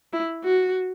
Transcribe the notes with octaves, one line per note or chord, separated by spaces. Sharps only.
E4
F#4